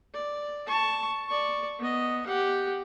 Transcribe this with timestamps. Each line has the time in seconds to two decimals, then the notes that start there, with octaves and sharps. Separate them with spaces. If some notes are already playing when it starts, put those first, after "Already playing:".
0.14 D5
0.67 A5 C#6
1.28 D5 C#6
1.79 B3 D#5
2.26 G4 F#5